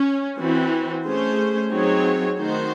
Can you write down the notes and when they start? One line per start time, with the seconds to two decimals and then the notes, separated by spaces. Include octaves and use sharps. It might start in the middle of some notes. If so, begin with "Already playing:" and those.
Already playing: C#4
0.38 E3 C4 F#4
1.05 A3 C#4 G#4 C5
1.71 F#3 C4 D#4 G#4 C#5
2.39 D#3 A3 D#4 F#4 C5